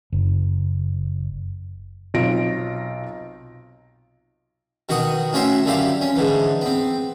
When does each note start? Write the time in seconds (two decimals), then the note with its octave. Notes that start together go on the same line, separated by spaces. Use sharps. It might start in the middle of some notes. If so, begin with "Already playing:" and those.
0.12 F#1
2.14 B1 C3 D#4 F4 A#6 D7
4.89 B2 D#3 F#4 C#6 D#6
5.33 A2 C#4 F#4 C5 E5
5.65 F#2 D3 E4 G4 F5
6.01 C#4
6.16 G#2 D3 E3
6.61 B3 C4